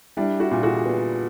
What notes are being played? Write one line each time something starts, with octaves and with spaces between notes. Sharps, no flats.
G3 D4 E4
E4 F#4
A#2
F#4 G#4
B3